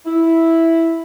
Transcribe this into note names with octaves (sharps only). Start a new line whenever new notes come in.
E4